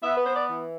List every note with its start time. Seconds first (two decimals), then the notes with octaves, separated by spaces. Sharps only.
0.03 B3 E5
0.16 B4
0.25 C5
0.35 D5
0.49 E3